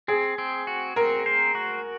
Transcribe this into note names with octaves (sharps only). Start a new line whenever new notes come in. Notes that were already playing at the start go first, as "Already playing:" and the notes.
C4 G#4
C4
F#4
C4 A#4
C5
F#4